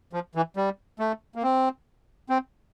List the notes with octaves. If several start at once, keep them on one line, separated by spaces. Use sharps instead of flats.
F3
E3
G3
A3
A#3
C4
C4